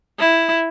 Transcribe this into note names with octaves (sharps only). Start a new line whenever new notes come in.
E4